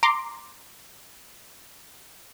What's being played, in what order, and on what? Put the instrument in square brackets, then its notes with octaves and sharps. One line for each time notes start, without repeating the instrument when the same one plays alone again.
[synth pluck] A#5 C6 D6